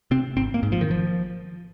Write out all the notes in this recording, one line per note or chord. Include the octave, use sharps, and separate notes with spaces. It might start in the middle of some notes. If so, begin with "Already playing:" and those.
C3 C4
G#1 C4
A#3
G#2
F3
D#3
G#1 F3